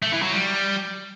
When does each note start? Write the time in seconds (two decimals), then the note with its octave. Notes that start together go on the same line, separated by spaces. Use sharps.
0.02 A3
0.12 E3
0.22 F#3
0.32 G3